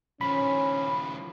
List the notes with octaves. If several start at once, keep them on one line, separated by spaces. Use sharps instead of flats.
D#3 F3 C#4 B5